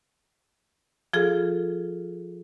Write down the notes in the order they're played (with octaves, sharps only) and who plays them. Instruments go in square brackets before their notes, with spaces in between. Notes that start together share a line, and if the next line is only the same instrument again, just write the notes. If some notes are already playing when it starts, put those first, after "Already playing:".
[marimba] F3 F4 G#4 A4